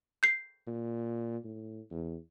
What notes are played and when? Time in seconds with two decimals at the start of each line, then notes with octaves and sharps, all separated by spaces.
0.23 G6 C7
0.67 A#2
1.44 A2
1.91 E2